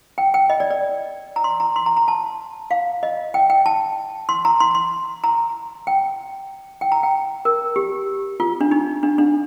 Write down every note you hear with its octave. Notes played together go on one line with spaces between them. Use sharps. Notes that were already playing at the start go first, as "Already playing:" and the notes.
G5
G5
D#5
D5
D5
A#5
C6
A#5
C6
A#5
A#5
A5
F5
D#5
G5
G5
A5
C6
A#5
C6
C6
A#5
G5
G5
A#5
G5
A#4
G4
F4
D4
D#4
D4
D4